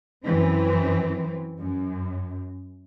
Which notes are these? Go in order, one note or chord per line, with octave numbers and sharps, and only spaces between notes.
F#2 E3 C4
F#2